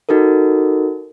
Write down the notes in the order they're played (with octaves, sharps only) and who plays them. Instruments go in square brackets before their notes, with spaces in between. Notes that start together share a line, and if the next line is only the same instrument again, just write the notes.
[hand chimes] D#4 F#4 A4 A#4